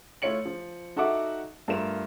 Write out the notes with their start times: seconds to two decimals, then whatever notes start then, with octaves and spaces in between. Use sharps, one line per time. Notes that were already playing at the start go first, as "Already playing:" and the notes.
0.22 A3 E4 F4 C#5 C#7 F#7
0.46 F3
0.96 D#4 F#4 A4 E5 F#5 D6
1.68 G2 A3 F4 A#4 E7